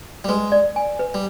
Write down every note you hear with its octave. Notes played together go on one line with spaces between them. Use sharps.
G3
G#3 B4
D5
G#5
B4
G3